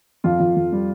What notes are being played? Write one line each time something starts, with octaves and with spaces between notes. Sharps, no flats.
F2 F4
F2
F2
G3